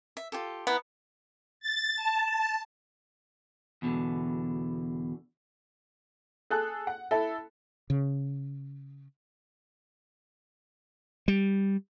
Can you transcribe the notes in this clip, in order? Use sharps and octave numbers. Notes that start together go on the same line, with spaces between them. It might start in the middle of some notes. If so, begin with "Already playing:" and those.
E5
F4 G4 A4
B3 E4 B4 A#5
A6
A5
E2 B2 D3
G#4 A4 F#6
F#5
E4 A4
C#3
G3